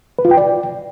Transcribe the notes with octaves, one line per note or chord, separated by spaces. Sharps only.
B4
F4
G5
D5